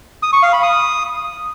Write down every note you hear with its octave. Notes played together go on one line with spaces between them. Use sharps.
D#6
C#6
F5
B5
D#6